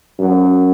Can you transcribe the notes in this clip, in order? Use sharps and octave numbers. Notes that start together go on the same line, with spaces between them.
F#2